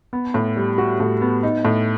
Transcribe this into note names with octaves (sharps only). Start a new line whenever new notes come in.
B3
A2
G3
F#4
A2
B3
D#4
A2